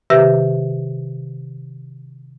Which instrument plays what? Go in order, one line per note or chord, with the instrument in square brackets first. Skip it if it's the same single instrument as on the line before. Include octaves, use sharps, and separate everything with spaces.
[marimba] C3 D#3 G4 B4 E5 A#6